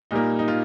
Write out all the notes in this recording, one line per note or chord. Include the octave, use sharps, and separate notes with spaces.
A#2 G3 A#3 D#4
D#4
F4